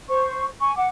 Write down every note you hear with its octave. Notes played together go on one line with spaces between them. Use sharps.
C5 C#6
G#5 C#6
F#5 D6